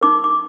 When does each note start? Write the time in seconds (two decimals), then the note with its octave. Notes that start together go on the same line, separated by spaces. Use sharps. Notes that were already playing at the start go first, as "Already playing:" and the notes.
0.01 D#4 A#4 D6
0.24 D6